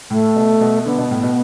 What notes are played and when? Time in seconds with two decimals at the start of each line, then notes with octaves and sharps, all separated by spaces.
0.10 A2 A3
0.36 B2
0.61 B2
0.86 D3 B3
0.98 B2
1.11 A2
1.23 B2